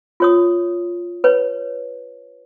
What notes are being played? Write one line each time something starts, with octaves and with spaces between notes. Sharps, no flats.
F4 C#5 D#6
B4 C#5